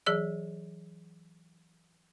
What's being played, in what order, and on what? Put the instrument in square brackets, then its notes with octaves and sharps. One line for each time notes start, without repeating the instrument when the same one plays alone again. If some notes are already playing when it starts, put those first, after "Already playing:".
[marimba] E3 F#3 G#4 D5 E6